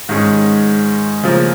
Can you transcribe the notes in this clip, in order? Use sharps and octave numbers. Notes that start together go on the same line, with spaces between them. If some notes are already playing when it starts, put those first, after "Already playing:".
G#2 D#3 G#3 C#4
C#3 F3 A#3